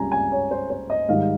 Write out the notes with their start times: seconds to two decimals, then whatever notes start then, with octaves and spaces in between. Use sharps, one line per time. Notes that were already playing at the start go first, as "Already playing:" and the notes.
Already playing: C#2 C3 G3 G#5 A#5
0.12 G#5
0.32 C#5
0.51 C5
0.70 C5
0.90 D#5
1.08 G#2 D#3 G3 F5